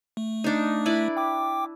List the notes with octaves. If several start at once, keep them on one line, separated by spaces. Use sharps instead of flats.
A3
D4 D#4
E4 B4 D5
G5 D6